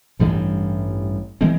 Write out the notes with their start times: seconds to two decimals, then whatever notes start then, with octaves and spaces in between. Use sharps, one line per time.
0.19 A1 G2 E3 G3
1.41 E3 G#3 C4